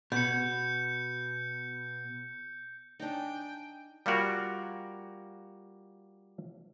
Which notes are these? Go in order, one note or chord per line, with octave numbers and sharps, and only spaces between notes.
B2 G6 C#7
D4 D#4 G5 G#5
G3 A#3 F4 F#4 A#4